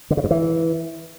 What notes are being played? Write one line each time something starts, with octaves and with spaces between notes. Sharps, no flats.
D3
C#3
G2
E3